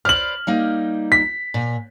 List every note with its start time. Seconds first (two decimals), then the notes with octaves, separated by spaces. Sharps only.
0.05 B4 C5 D5 F6 F#7
0.47 G3 A#3 D#4
1.12 B6
1.54 A#2